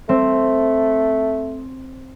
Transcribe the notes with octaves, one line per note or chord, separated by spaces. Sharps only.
A3 C4